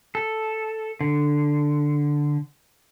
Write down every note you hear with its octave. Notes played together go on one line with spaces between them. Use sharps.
A4
D3